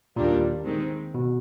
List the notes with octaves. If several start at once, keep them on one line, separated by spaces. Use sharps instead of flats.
D#2 A#2 D#3 G3 A#3 D4
D#3 G#3 C4
B2